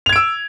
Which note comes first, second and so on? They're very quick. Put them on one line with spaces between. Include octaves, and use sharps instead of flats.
F7 G#6 D7 E6